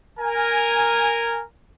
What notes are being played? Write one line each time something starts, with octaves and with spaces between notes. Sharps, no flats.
A#4 G#5